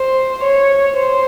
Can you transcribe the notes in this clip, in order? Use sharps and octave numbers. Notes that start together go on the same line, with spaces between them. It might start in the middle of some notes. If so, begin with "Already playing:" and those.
Already playing: C5
C#5
C5